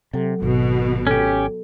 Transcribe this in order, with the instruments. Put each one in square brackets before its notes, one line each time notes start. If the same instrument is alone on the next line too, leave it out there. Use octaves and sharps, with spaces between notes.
[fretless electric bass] C3 [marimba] F#3 A4
[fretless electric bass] G#1 [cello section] B2
[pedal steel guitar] C#4 G4 [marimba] A4